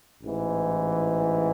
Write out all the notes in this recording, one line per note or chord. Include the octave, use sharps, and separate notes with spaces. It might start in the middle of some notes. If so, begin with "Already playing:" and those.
A1 G#2 E3